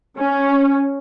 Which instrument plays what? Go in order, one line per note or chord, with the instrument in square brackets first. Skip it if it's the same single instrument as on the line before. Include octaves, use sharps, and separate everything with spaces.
[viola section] C#4